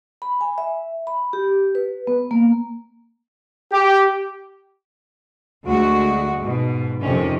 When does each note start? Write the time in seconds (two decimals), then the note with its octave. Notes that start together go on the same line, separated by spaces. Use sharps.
0.22 B5
0.41 G#5
0.58 E5
1.07 B5
1.33 G4
1.75 B4
2.07 B3
2.31 A#3
3.72 G4
5.65 D2 G#3 F#4
6.40 G#2 B2
7.02 F2 C3 D#3 C#4